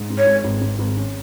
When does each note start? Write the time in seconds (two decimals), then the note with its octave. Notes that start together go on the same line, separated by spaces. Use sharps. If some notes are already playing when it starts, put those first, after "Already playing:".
Already playing: G#2
0.10 G#2
0.18 C#5
0.26 G#1
0.44 G#1
0.61 G#1
0.79 G#1
0.97 C#4